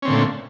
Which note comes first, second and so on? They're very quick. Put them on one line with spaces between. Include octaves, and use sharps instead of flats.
C#4 C4 D3 A#2 A3